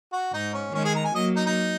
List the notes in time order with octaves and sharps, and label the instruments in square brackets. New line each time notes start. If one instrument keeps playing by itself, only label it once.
[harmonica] F#4
[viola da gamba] G#2 [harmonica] D#4
[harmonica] C#4
[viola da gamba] D#3 G#3 [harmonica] C#4
[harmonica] G#4
A#5
G#5
[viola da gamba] F#3 A#3 [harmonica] D#5
[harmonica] D#4
D#4